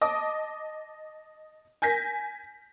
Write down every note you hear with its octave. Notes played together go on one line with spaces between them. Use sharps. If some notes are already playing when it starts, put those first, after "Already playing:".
D#5 A5 D6 D#6
G#5 G6 A#6 B6